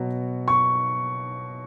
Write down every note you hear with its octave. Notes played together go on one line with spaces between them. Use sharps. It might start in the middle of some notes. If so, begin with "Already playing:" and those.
Already playing: B2 F#3
C#6